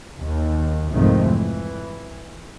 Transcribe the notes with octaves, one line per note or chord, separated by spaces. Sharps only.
D#2
C2 F2 G#2 D#3 F3 A3
E3